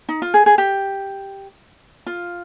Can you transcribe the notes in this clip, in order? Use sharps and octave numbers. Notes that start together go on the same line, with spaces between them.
D#4
F4
G#4
G#4
G4
F4